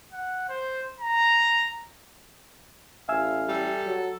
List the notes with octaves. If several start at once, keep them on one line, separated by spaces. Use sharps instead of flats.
F#5
C5
A#5
A1 E5 F5 G#5 E6
G3 A4
F#3